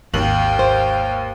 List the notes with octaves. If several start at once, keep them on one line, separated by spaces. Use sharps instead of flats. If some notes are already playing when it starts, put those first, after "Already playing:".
G#1 D#2 F5 G5 F#7
C5